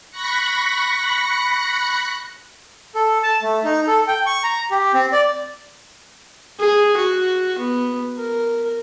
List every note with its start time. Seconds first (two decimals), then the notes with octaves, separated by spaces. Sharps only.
0.11 B5 C#6 F#6 A#6 C#7
2.95 A4
3.23 A5
3.42 A3
3.64 D#4
3.87 A4
4.08 G5
4.26 C#6
4.43 A#5
4.71 G4
4.94 C4
5.13 D5
6.60 G#4
6.97 F#4
7.59 B3
8.18 A#4